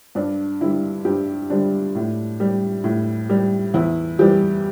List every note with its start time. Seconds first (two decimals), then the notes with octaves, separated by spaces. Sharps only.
0.15 G2 D4
0.61 D3 G3 E4
1.05 G2 G4
1.50 D3 G3 D4
1.95 A2
2.40 G3
2.84 A2
3.29 G3
3.74 E2 E4
4.19 E3 G3 G4